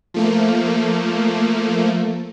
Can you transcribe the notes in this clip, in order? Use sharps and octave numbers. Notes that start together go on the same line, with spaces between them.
F3 A3 A#3